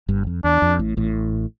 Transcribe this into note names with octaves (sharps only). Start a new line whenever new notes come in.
G1 G2
F2
E2 D4
F2
A1 A2
A1 A2